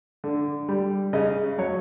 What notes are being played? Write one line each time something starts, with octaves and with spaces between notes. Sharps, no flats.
D3
G3
C#3 D#5
F#3 C#5